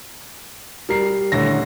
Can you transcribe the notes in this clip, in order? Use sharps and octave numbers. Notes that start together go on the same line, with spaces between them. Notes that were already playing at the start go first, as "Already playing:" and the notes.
G3 A#4 C7
D#1 A2 D3 C#5 A#6